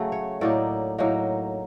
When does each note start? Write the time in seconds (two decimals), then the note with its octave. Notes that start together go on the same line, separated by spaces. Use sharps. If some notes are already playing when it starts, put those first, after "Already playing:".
Already playing: C#3 F#3 A3
0.12 C#5
0.41 A2 F#3 A#3 D#4 D5
0.98 A2 F#3 A#3 D#4